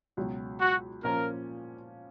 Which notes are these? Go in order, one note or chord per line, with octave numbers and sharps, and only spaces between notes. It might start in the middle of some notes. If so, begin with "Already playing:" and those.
C#2 B2 F#3
F#4
A#2 F3 A#3 C#4 F4 A#4